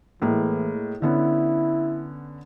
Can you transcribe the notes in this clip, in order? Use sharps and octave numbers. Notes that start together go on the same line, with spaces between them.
A2 E3 G#3 A#3
D3 B3 C#4 E4